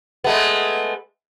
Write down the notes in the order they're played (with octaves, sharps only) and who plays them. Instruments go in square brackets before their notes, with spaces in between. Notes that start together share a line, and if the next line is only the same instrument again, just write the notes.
[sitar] G#3 A3 B3